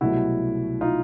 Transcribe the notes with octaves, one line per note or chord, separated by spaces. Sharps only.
C2 B2 F#3 A3 E4 F#4
D#4 F4